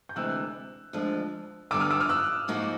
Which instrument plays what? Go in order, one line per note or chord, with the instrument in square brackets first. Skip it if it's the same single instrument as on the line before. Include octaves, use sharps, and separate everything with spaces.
[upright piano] G6
[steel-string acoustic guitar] D2 C3 E3 G#3 [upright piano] E6 F#6
[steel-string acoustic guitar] D2 D3 F3 G#3
[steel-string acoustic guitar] G2 D3 G3 B3 [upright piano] D6 E6
[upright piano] D#6 F6
D6 E6
D#6 F6
E6 F#6
[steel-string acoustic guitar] G#2 F3 A#3 D#4 F#4